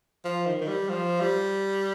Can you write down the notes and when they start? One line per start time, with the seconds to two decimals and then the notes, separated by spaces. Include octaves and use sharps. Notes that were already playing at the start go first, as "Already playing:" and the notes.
0.25 F3
0.46 D#3
0.61 D#3
0.67 G3
0.89 F3
1.20 G3